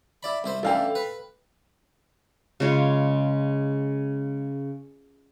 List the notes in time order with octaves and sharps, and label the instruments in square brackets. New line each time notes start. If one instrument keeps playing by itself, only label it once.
[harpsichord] E4 D5 B5
C2 E4 C5
[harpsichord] A1 D3 E4 [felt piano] A4 F5 G5
[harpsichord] B4
[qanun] C#3 G#3 F4 C#5